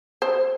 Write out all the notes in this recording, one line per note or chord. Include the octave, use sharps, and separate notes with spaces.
C5